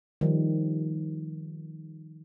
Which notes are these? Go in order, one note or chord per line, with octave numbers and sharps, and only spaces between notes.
D#3 F3 G3